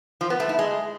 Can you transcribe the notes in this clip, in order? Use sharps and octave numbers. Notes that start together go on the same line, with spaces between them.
F3
B3
A3
E4
G#3